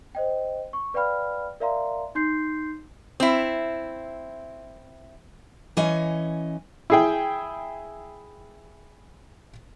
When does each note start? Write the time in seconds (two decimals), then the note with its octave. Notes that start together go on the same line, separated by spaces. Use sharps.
0.15 C5 D#5 G5
0.73 C#6
0.94 B4 D5 F5 G5 B5 F6
1.60 A#4 D5 E5 F5 A#5 C6
2.15 D#4 C6 G6 C7
3.20 C4 E4
5.77 E3 C#4 D#5 G#5
6.90 E4 G#4 G5